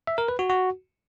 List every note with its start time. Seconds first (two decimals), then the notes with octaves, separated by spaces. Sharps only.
0.07 E5
0.18 A#4
0.28 B4
0.39 F#4
0.50 F#4